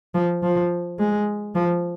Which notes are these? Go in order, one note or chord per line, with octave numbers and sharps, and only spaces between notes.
F3
F3
G#3
F3